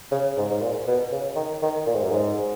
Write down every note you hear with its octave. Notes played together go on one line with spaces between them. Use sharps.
C#3
G#2
G#2
A#2
B2
C#3
D#3
D#3
A#2
G#2
F#2
G#2